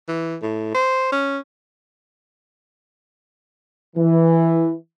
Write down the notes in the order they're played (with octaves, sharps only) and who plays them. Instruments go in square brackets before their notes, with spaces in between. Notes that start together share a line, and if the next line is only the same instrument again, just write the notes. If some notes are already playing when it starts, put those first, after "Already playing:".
[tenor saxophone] E3
A2
C5
C#4
[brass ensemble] E3